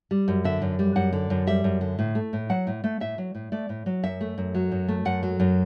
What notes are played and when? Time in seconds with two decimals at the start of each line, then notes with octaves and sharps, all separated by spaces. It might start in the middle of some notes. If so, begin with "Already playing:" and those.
0.11 G3
0.28 F#2
0.44 D3 E5
0.62 F#2
0.79 G3
0.96 F#2 F#5
1.13 D3
1.30 F#2
1.47 G3 E5
1.64 F#2
1.81 D3
1.99 A2
2.15 A3
2.33 A2
2.50 F#3 F#5
2.67 A2
2.84 A3
3.00 A2 E5
3.18 F#3
3.35 A2
3.52 A3 D5
3.69 A2
3.86 F#3
4.03 F#2 E5
4.21 A3
4.38 F#2
4.55 F#3
4.72 F#2
4.88 A3
5.05 F#2 F#5
5.23 F#3
5.40 F#2